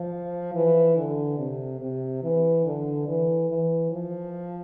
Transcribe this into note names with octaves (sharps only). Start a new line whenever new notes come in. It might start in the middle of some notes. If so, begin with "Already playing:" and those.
Already playing: F3
E3
D3
C3
C3
E3
D3
E3
E3
F3